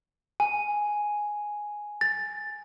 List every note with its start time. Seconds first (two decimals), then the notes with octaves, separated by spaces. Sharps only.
0.40 G#5
2.01 A6